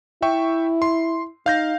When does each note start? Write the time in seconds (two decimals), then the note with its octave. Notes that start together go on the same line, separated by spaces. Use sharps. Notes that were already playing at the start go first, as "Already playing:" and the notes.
0.22 E4 E5 G5 C#6
0.82 C6
1.46 D#4 F5 G6 A#6